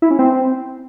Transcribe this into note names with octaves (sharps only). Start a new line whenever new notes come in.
E4
C#4
C4